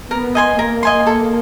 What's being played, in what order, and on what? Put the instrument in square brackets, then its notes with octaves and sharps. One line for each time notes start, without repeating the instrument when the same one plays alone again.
[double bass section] B3 [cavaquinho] A#4
[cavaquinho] D#5 G#5 C6
[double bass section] A#3 [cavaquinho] A#4
[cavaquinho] D#5 G#5 C6
A4